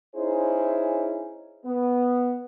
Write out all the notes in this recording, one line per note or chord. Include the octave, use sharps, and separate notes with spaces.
C#4 D#4 E4 G#4 C5
B3